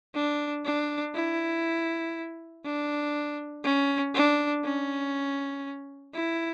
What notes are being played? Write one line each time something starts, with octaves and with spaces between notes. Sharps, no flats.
D4
D4
E4
D4
C#4
D4
C#4
E4